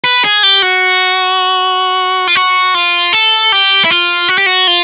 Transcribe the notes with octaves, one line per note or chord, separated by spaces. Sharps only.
B4
G#4
G4
F#4
F4
F#4
F4
A4
G4
E4
F4
F#4
G4
F#4
F4